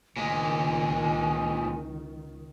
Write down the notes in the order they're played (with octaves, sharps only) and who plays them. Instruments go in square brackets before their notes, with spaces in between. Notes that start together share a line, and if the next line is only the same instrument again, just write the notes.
[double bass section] C#2 D#3 [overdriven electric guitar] A#2 G#3 [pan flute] G#5